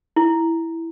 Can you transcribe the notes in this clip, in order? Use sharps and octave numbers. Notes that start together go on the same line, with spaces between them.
E4